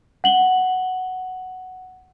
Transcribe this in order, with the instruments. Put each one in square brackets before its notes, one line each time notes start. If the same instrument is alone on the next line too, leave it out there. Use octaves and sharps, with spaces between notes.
[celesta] F#5 F#7 G7